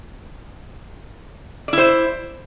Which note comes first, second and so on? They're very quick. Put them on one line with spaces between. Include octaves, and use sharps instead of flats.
D5 E4 C5